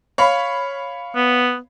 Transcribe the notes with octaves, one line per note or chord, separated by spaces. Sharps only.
C#5 F5 B5
B3